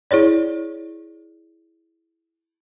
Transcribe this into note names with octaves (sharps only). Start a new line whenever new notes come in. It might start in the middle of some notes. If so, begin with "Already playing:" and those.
E4 G#4 C#5 D5